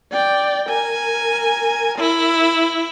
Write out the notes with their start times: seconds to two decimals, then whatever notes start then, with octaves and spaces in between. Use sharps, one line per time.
0.12 D5 G5
0.69 A#4 G#5
1.98 E4